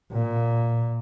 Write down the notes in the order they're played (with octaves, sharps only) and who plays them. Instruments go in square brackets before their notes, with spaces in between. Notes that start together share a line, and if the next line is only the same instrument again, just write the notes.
[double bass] A#2